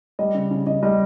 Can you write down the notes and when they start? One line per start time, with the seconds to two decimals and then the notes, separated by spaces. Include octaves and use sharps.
0.19 G3 D#5
0.35 C#3
0.51 C#3
0.67 C#3 D#5
0.83 G3 D#5